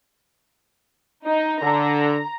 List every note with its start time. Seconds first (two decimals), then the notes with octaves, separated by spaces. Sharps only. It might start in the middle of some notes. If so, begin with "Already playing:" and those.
1.24 D#4
1.63 D3 A#5